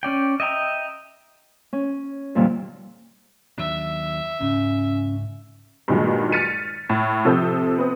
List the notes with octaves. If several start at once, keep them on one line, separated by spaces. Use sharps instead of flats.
C#4 D5 G5
D#5 E5 G5 A#5
C#4
F2 A#2 D3 D#3 G3
D#2 F#3 D4 E5
C#2 G#2 C#3 C#4
G2 A#2 D#3 F#3 G#3
F6 A6 B6 C#7 D#7
A2
C3 F3 A4 D#6 E6 G6
B3 C4 D#6